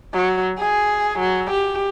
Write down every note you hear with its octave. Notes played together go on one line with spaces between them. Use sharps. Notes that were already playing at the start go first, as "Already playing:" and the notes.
F#3
G#4
F#3
G4